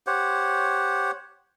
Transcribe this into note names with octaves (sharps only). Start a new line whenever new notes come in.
G4 C5 C#5 F#5